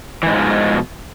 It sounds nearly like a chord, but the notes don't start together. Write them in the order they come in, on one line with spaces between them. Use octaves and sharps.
E3 G#2 G#3 F3 B2